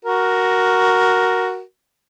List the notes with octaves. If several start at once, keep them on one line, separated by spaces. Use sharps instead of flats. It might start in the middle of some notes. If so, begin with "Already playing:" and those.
F#4 A#4